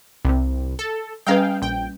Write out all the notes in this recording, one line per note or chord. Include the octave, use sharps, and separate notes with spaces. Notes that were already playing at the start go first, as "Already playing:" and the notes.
C2 C3
A4
G3 C#4 G#4 B4 F5 G5
A#1 G5